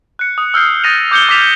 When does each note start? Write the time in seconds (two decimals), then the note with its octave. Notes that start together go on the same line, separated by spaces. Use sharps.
0.19 F#6 C#7
0.38 D#6
0.54 E6 F6 G6 C7 C#7
0.84 D#6 F6 A6 A#6 D#7 F7
1.11 D6 G6 C#7 G7
1.29 D6 F6 A6 B6 E7 F7